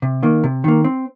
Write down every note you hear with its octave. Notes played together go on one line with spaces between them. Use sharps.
C3
D#3 A#3
C3
D#3 A#3
C4